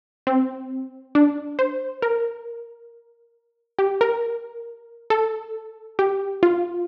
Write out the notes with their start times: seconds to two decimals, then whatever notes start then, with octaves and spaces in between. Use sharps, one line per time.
0.27 C4
1.15 D4
1.59 C5
2.02 A#4
3.79 G4
4.01 A#4
5.10 A4
5.99 G4
6.43 F4